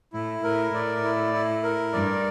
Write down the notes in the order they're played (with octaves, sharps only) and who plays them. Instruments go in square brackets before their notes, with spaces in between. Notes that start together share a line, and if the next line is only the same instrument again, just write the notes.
[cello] A2 [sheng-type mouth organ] E4
[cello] A2 [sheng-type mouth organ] A#4
[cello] A2 [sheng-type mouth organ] D5
[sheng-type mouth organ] E4
E4
A#4
[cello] G2 [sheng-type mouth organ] D5